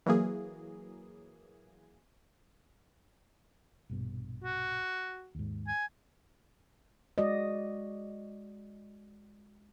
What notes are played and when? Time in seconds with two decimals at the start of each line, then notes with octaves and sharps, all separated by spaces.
0.06 E3 F#3 A#3 G#4
3.90 A#1 G2 B2
4.44 F#4
5.35 D#2 G#2
5.68 G#5
7.18 G#3 F#4 D5 D#5